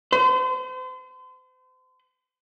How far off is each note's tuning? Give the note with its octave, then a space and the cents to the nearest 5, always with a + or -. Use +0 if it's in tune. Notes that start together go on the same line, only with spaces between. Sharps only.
C5 -40